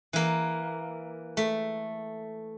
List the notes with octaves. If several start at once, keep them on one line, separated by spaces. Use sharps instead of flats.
E3 A#3
A3